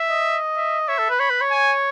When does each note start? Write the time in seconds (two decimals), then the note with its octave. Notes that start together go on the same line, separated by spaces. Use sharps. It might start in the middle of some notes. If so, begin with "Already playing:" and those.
Already playing: E5
0.09 D#5
0.56 E5
0.88 C#5 E5
0.98 A4
1.09 B4
1.20 C#5 B5
1.30 B4
1.41 C#5
1.51 G#5